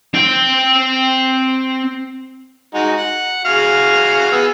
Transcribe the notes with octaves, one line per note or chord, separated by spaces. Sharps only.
C4 G5
G#3 D#4 F#4
F#5
F#4 G#4 F5
B3 G#4 E6